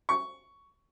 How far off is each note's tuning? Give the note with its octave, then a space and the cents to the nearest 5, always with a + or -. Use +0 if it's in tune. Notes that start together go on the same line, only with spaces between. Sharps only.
C#6 +10